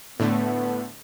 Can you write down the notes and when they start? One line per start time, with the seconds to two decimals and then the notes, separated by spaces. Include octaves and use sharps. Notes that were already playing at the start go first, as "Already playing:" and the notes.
0.20 A2 D3 A3 B3